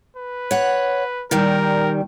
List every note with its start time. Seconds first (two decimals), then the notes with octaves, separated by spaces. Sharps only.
0.16 B4
0.51 C#5 F#5
1.31 A#2 D#3 G3 A#4